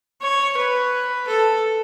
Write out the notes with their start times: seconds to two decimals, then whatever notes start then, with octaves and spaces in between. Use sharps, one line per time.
0.21 C#5
0.57 B4
1.27 A4